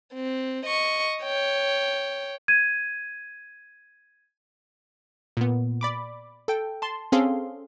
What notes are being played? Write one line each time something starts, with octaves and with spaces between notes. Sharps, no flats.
C4
D#5 C#6
C#5 G5
G#6 D#7
A#2 B3
D5 B5 D6
A4 G5
A5 C6
C4 C#4 G#4 A4 F5 C6